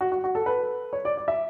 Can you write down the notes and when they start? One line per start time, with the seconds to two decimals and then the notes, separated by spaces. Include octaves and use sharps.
0.01 F#4
0.12 F#4
0.24 F#4
0.35 A4
0.46 B4
0.93 C#5
1.05 D5
1.17 D5
1.28 E5